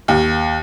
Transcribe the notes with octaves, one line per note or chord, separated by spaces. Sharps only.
D#2